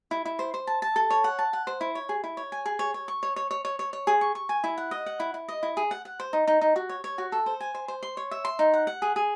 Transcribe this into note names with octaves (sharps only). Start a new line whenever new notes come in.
E4
E4
C5
C5
A5
A5
A4
C#5
F#5
A5
F#5
C5
E4
C#5
G#4
E4
C#5
G#5
G#4
C#5
C#5
C#6
C#5
C#5
C#5
C#5
C#5
C#5
G#4
C#6
C#6
G#5
E4
F#5
D#5
F#5
E4
E4
D#5
E4
G#4
F#5
F#5
C5
D#4
D#4
D#4
F#4
C#5
C#5
F#4
A4
C5
G#5
C5
C5
C6
C#5
E5
C6
D#4
F#5
F#5
G#4
G#4